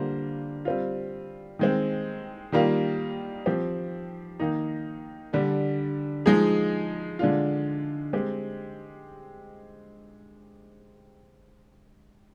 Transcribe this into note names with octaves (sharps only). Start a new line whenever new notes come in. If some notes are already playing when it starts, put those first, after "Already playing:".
Already playing: D3 G3 A#3 F4 C5
G3 C4 F4
D#3 G#3 C4
D#3 G3 A#3 F4
F3 C4 G4
D#3 A#3 D#4
D3 G3 D4
F3 G#3 D#4 G#4
D3 G#3 D4 F4
G#3 C4 G4